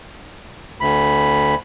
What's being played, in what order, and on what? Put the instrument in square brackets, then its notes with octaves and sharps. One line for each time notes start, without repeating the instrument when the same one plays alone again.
[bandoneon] D2 B5